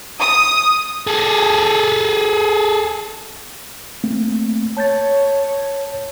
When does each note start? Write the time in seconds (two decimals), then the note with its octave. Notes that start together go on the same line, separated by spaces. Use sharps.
0.20 D#6
1.07 G#4 A4
4.04 A3 A#3 C4
4.77 C#5 A5 G6 A6